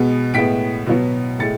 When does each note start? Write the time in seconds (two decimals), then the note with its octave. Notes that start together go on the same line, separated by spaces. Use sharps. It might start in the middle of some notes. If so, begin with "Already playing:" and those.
Already playing: B2 G#3 B3
0.34 A2 G#3 B3 B6 D7
0.86 B2 F#3 B3
1.39 A2 G#3 A6 C#7